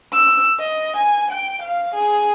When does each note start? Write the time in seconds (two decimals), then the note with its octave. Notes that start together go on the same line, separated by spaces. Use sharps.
0.13 E6
0.59 D#5
0.97 G#5
1.31 G5
1.62 F5
1.95 G#4